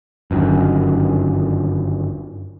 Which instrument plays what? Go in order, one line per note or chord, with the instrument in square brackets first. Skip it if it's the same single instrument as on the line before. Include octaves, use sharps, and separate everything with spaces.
[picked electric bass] G1 F#2 D#3